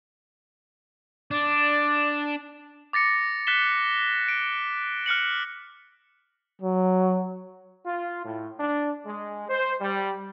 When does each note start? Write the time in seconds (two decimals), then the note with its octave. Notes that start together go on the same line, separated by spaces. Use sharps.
1.31 D4 D5
2.93 D6 A6 A#6 C#7
3.47 F#6 A6 B6 E7 G7
4.28 D7
5.06 F6 F#6 C#7 F#7
6.61 F#3
7.86 F4
8.24 A2
8.60 D4
9.06 G#3
9.49 C5
9.81 G3